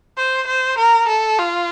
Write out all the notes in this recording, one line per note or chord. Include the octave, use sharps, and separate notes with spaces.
C5
C5
A#4
A4
F4